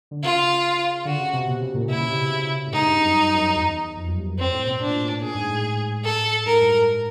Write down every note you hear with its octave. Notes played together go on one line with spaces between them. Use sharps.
D3
C#3 F4
D3 F#4
C#3
C3
B2
C#3
A#2
B2 E4
C#3
C3
C#3
A2
G#2 D#4
G2
F#2
G2
F#2
E2
F2
F#2
G2
F#2
F2 C4
A2
B2
B2 D4
A#2
A2
A#2
A#2 G#4
G#2
A2
A4
G#2 A#4
G2
G#2